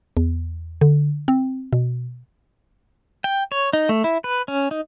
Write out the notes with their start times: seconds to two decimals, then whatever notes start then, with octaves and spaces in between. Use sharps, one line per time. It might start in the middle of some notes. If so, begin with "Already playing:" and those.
0.17 E2
0.81 D3
1.28 C4
1.73 B2
3.24 G5
3.52 C#5
3.73 D#4
3.89 A3
4.04 E4
4.24 B4
4.48 C#4
4.71 D#4